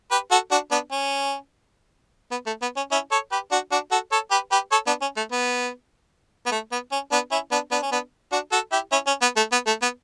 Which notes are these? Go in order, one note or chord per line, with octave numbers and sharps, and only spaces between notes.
G4 B4
F#4 A4
D4 F#4
B3 D4
C#4
B3
A3
B3
C#4
C#4 E4
A4 C#5
G4 B4
D4 F#4
D4 F#4
F#4 A4
A4 C#5
G4 B4
G4 B4
A4 C#5
B3 D4
C#4
A3
B3
B3
A3
B3
C#4
B3 D4
C#4 E4
B3 D4
B3 D4
C#4
B3 D4
D4 F#4
F#4 A4
E4 G4
C#4 E4
C#4
B3
A3
B3
A3
B3